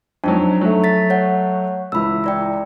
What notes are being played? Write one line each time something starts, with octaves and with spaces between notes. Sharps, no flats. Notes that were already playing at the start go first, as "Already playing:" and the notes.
F2 F#3 D4 D#4
F#3 A3
A6 B6
C#5 F#5
C#2 E3 B5 E6
E4 D5 G5